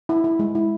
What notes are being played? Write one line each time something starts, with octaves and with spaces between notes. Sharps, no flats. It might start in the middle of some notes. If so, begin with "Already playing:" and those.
E4
E4
G#3
E4